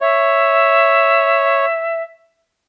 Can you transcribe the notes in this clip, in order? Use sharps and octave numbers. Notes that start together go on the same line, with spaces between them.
C#5 E5